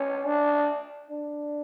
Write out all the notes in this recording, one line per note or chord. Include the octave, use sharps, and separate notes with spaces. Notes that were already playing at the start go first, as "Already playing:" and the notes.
Already playing: C#4
D4
D4